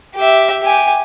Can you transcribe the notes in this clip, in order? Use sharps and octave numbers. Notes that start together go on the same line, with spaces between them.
G4 E5
G4 G#5